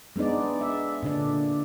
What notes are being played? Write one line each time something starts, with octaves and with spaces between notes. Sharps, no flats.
G#3 B3 D4 D#4 D5
E5
A#2 D3 D4 D5